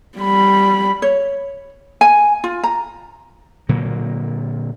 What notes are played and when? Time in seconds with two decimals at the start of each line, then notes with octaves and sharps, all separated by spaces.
0.18 G3 B5
1.02 C#5
2.01 G#5
2.44 F4
2.64 A#5
3.69 A#2 D3 F#3 A#3